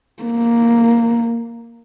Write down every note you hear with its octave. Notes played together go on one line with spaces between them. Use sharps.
A#3